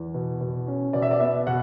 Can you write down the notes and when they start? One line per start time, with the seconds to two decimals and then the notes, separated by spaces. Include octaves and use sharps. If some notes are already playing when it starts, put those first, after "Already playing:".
Already playing: E2
0.14 B2
0.41 B2
0.67 C#4
0.93 B2 D5
1.02 E5
1.11 D5
1.20 B3 E5
1.47 B2 F#5